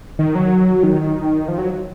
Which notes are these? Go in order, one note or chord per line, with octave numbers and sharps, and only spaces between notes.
D#3
F#3
D#3
F3
F#3